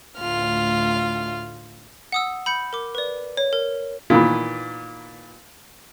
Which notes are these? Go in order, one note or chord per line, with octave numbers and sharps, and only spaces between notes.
D2 A2 F4 F6
F#5 D#6 E6
B5 G6 C#7
A#4 D6
B4 D5
C#5
A#4
A#2 D#3 E3 B3